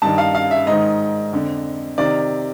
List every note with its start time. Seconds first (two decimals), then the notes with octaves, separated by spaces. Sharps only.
0.02 G2 D#3 A5
0.18 F5
0.35 F5
0.51 E5
0.67 G#2 D#3 D#5
1.33 F2 D3
1.98 C3 D#3 D5